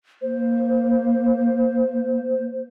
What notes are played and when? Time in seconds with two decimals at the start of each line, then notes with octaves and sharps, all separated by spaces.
0.22 A#3 C5